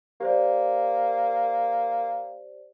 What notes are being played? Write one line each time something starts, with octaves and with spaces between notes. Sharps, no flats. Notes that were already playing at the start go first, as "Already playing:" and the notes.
A#3 G4 C5 D5